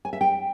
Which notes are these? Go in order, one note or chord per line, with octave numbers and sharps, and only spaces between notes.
G#5
E5
G5